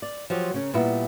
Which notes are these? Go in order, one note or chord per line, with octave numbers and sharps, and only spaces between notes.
D5
F3 F#3 G4
C#3 C#4 A#4
A#2 G3 B3 E4